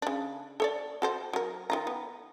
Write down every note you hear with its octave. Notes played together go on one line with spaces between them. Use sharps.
C#3 D4
A4 C#5 D5
F#4 A4 C5
F#3 A#4
D#3 F4 A#5
B3